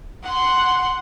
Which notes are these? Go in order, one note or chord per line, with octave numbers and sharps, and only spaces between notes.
F#5 C6